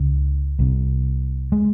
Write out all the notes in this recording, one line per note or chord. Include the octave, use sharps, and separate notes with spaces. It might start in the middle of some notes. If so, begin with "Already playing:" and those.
Already playing: C#2 C#3
C2 C3
G#3